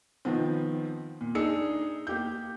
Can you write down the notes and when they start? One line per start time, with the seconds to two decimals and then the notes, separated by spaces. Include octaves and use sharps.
0.25 D#3 F3 B3 C4
1.21 A#2
1.35 D4 D#4 G#4 E6 C#7
2.07 A#3 G4 G6